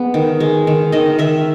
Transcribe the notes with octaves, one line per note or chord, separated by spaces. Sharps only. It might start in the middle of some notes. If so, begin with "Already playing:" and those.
Already playing: G#3 B3
D#3
G#3
D#3
D#3 D#5
D#3 E5